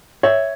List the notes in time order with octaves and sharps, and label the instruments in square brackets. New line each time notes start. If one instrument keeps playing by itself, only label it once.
[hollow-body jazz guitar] C#5 E5